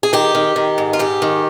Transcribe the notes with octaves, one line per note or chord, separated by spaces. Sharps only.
G#4
D#3 G4
D#3
D#3
G#2
F4
G#2 G4
D#3